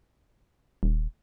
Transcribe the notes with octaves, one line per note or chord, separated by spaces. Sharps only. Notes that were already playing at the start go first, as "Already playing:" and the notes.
D#1